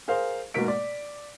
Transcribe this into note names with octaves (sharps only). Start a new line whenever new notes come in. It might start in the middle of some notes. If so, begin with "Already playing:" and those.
G#4 A#4 C5 F5
G#2 B2 A#3 A#4 B6 D7
D5